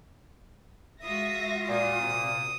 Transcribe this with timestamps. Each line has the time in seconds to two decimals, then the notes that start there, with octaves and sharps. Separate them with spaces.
1.03 G#3 F4 F#4 E5 D#6 A#6
1.68 A#2 D#6
1.99 C3